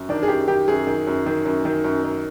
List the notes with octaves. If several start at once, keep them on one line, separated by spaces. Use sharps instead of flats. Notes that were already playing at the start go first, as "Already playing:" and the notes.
Already playing: F#2
D#3 D4
G#4
F#2 G4
D#3 G4
F#2 G#4
D#3
F#2
D#3
F#2
D#3
F#2
D#3